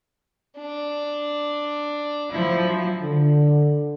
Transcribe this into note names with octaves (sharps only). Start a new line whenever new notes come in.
D4
F3 F#3 E4
D3